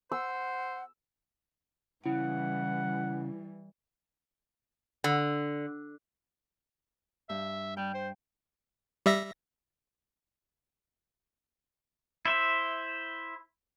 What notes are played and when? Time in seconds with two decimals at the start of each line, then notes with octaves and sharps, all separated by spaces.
0.12 C5 F#5 E6
2.06 C#3 E3 G3 E4 F#5
5.04 D3
7.29 G2 E5
7.77 G3 G5
7.94 C5
9.06 G3 E5 A#6
12.25 E4 C5 E5